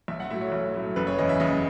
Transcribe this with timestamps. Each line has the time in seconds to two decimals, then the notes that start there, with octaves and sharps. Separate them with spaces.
0.08 B1 E5
0.20 F#5
0.30 A2 F#3 E5
0.41 C#5
0.52 B1
0.75 A2 F#3
0.96 F#1 B4
1.07 C#5
1.18 E2 C#3 D#5
1.29 E5
1.40 F#1 D#5